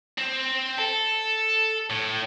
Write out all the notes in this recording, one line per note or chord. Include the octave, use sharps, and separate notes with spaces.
C4
A4
A2